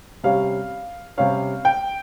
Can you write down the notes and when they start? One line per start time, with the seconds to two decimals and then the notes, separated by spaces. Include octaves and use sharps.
0.23 C3 G3 C#4 F5
1.18 C3 G3 C#4 F5
1.65 G5